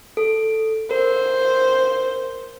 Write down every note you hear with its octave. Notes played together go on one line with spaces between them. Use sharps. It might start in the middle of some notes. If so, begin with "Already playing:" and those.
A4
A#4 C5